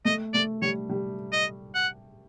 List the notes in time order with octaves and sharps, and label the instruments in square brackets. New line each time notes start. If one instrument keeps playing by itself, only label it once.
[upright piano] A3 [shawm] D#5
[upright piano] A3 [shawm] D5
[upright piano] G3 [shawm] C#5
[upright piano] G3
[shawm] D#5
F#5